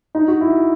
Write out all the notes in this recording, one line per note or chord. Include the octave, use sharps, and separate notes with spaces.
D#4
F#4
E4